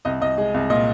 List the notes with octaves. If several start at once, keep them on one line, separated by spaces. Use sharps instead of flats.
C2 D#5
C2 D#5
G#3
C2
A#2 D#5